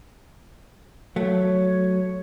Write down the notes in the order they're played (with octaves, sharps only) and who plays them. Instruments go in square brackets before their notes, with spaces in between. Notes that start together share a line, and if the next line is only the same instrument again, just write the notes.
[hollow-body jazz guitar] F#3 A3 [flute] C#5